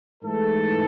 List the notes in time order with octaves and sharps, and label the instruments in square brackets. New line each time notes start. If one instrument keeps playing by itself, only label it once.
[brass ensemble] G#2 E3 A3 A4